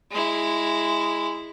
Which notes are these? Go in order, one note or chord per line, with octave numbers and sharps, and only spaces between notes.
G#3 E4